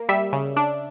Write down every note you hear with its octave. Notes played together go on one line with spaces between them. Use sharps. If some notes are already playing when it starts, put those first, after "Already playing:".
Already playing: A#3
G3 E5
C#3
D4